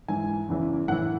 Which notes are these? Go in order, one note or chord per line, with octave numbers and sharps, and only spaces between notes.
G#2 E3 G#5
E2 C#3 E3
A2 E3 F#5